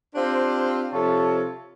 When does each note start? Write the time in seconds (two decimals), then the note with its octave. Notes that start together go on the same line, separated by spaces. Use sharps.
0.15 C4 D4 F4 G4 C5
0.92 C3 F3 F4 A4 C#5 A5